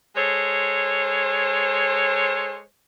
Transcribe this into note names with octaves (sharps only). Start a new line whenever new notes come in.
G#3 A4 C5 C#5